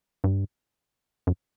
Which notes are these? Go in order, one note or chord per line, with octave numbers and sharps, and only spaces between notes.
G2
F#2